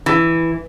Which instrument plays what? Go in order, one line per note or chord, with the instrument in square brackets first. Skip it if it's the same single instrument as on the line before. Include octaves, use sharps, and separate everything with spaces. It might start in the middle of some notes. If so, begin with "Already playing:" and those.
[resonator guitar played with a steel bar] E3